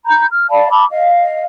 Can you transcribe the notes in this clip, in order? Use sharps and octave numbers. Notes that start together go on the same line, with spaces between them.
A#5 B5 G6
F6
D5 F5 A5 B5
A5 B5 D6 E6
D#5 F5